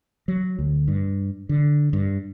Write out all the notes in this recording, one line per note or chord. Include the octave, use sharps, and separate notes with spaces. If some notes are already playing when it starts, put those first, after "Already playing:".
F#3
D2
G2
D3
G2